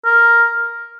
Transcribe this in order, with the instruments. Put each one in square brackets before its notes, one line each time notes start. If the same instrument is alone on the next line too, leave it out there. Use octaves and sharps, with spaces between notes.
[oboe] A#4